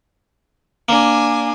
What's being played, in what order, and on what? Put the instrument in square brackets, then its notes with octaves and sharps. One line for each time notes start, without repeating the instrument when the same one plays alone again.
[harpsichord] A#3 [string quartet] D4 G#5